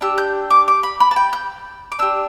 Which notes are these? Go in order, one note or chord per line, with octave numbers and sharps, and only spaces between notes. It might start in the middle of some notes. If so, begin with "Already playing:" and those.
D4 G4 E6
G6
D6
D6
B5
B5
A5
G5
G6
D6
D4 G4 E6